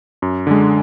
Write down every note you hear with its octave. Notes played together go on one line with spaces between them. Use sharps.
F#2
D3 G#3